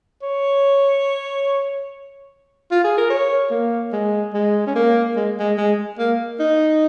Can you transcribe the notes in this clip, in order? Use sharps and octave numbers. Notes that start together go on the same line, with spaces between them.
C#5
F4
G#4
A#4
C#5
A#3
G#3
G#3
C#4
A#3
G#3
G#3
G#3
A#3
D#4